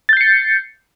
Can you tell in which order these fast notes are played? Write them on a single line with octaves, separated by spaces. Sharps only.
A6 G6 C7 C#7